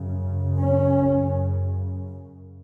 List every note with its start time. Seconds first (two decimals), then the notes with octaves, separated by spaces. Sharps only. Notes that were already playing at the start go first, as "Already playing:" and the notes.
Already playing: F#2 C#3
0.60 C#4